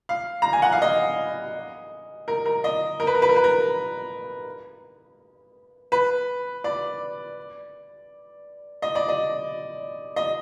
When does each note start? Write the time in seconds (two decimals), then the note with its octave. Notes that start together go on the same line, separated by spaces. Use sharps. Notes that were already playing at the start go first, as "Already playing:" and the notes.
0.09 F5
0.42 A#5
0.53 G#5
0.62 F#5
0.72 F5
0.82 D#5
2.28 A#4
2.46 A#4
2.64 D#5
3.00 A#4
3.07 B4
3.15 A#4
3.22 B4
3.29 A#4
3.36 B4
3.44 A#4
5.92 B4
6.64 D5
8.82 D#5
8.95 D5
9.08 D#5
10.16 D#5